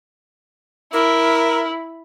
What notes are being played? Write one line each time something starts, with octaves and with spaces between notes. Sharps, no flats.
E4 A#4 E6